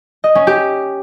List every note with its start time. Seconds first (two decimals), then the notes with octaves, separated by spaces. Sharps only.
0.24 D#5
0.35 C#4
0.47 G4